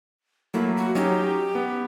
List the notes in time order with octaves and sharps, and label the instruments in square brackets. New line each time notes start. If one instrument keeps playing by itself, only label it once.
[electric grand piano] F#3 A3 A#3 [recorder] E4
[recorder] F#4
[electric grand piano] F#3 C#4 D#4 [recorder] G4
[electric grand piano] B3